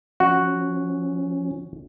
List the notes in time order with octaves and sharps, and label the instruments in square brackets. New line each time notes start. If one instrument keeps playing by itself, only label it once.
[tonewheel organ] F3 C#4 [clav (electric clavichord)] F#4